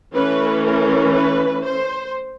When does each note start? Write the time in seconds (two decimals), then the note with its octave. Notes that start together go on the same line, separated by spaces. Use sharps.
0.14 E3 A3 C#4 B4
0.65 A#4
1.14 B4
1.64 C5